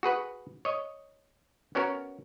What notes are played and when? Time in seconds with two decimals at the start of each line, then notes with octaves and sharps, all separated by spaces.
0.03 F#4 G#4 B4 F#5
0.65 C#5 D#5
1.75 B3 C#4 F#4 A#4